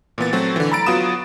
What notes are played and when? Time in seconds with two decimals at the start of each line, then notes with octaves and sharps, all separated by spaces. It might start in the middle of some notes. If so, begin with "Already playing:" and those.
0.18 A#2 E3 B3 A6
0.33 F#3 A3 C4 F#4
0.56 D3 E3
0.72 A#5 B5 E6 A6 D7
0.86 F#3 B3 F4 F#4 D#6 E7